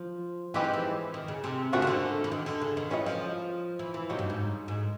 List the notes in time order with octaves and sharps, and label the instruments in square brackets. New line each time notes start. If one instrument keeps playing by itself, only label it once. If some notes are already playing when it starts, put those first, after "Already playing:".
Already playing: [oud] F3
[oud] E3 [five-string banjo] G#3 C4 D#4 G4 B4
[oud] F3
E3
D#3
C#3
C3
[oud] C#3 [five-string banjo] F3 A3 D4 F#4 A#4
[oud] D#3
D3
E3
D#3
D3
C#3
D#3
[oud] E3 [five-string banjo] C#4 F4 A4 C5 D#5
[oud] F3
E3
E3
[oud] C3 [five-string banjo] F#3 A#3 D#4
[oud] G2
G#2
G#2